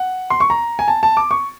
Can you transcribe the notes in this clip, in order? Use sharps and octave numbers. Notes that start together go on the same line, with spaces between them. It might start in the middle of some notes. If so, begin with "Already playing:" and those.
Already playing: F#5
C6
C#6
A#5
G#5
A5
A5
D6
C#6